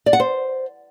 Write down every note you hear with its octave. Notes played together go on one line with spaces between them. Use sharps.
D5
F#5
C5